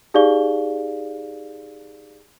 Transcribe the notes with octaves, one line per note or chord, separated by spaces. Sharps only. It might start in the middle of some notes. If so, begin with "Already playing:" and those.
D#4 G4 G#4 D5 F5 G7